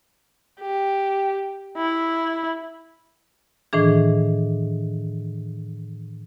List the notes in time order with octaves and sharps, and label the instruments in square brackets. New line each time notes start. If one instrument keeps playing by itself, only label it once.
[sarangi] G4
E4
[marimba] A2 D#3 E3 D4 G#4